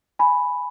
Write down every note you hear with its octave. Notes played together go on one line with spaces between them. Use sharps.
G#5 B5